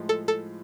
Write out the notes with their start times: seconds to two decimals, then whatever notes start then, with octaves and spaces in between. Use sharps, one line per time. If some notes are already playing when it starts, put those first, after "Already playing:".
Already playing: A2 F3 G#3
0.09 A4
0.28 A4